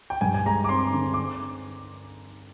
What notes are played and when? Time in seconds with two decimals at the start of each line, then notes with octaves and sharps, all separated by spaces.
0.10 G5
0.21 G2 G#5
0.34 G#5
0.46 G#3 A#5
0.64 D6
0.69 C4 C6
0.93 D3
1.14 D6